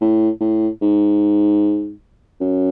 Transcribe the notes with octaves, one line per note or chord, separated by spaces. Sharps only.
A2
A2
G#2
F#2